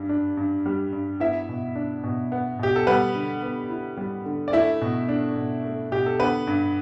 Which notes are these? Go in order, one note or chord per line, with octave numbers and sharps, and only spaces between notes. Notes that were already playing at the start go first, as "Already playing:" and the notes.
Already playing: G2 G3
D4
G2
G3
G2
B3 E4 E5
B2
D4
B2
B3
B2 G4
A4
G3 B3 B4
D3
B3
E4
G3
D3
D5
A3 E4 E5
B2
D4
B2
A3
B2 G4
A4
D3 B3 B4
G2